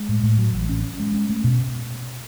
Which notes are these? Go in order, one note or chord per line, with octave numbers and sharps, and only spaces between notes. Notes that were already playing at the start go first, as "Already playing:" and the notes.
Already playing: G#3
A2
A2
F#3
A1
C#4
C#4
G#3
C#4
A3
B2